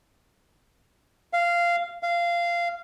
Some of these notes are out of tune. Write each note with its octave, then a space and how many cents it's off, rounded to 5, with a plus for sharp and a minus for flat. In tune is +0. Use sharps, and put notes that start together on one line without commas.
F5 -10
F5 -15